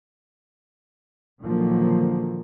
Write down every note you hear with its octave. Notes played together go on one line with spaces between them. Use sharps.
A#2 D3 D#3 F3 F#3 A#3